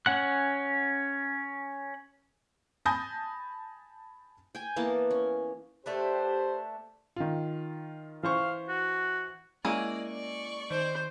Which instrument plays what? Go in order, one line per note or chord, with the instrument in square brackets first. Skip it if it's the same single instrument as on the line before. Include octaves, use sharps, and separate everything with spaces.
[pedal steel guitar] C#4 F#5 F#6
[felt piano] G#5 A5 B5 D#6 G6 A#6
[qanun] G5 G#5
E3 A#3 B3 A5
C#4
[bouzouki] A3 D4 B4 [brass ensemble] G4 C5
[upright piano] D#3 F4
[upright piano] E3 C5 C#6 [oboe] F5
[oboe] F#4
[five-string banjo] G#3 A#3 G#4 [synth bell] C#4 E4 [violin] D5
[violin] D5 C#6
[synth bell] D#3 D7 [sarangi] C5